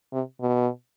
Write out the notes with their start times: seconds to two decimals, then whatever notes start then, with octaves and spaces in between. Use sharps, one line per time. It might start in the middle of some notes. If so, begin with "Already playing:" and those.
0.13 C3
0.41 B2